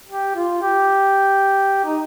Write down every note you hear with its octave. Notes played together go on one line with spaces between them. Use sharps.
G4
F4
G4
D#4